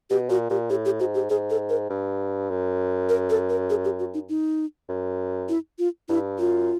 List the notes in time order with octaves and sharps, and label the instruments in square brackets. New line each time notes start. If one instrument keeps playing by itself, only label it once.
[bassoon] B2 [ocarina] G4
[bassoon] A#2 [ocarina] F#4
[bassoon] A#2 [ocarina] G4
[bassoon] A2 [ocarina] G4
[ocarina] G4
[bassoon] G#2 [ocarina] F#4
[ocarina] G4
[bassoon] G#2 [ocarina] G#4
[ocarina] A4
A#4
[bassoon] G2
F#2
[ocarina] A#4
A4
A#4
G#4
G4
F#4
D#4
D#4
[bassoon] F#2
[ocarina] E4
F4
[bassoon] G2 [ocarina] E4
[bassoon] F#2 [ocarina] F4